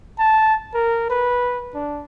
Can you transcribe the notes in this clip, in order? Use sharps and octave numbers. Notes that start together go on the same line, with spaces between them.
A5
A#4
B4
D4